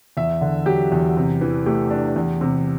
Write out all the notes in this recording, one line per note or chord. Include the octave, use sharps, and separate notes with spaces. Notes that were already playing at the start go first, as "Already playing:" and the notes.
E2 E5
D3
F#3 G4
E2
C3
E3
A3 G4
D4
E2
C3